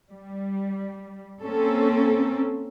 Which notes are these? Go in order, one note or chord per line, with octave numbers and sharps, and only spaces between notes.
G3
A#3 C4 C#4 A4